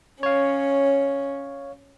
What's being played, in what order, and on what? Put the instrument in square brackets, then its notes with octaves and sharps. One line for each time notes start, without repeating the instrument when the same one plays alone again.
[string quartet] C#4 [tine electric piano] C#5 F5